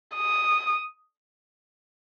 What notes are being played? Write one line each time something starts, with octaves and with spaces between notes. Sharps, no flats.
D#6